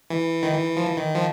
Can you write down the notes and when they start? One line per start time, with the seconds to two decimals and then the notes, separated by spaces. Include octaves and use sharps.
0.10 E3
0.43 D#3
0.53 E3
0.77 F3
0.87 E3
0.97 D#3
1.15 F3